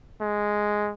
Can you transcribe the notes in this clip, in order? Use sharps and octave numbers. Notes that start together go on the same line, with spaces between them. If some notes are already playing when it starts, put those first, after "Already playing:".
G#3